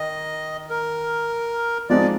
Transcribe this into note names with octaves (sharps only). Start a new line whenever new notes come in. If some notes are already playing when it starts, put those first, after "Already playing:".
Already playing: D#3 D#5
A#4
F3 G#3 C4 D#4 D5